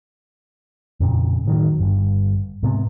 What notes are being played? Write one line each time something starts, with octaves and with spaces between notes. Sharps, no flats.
F2 A#2 C#3
A2 D#3 F#3
G1 G2
G#2 C3 G#3 B3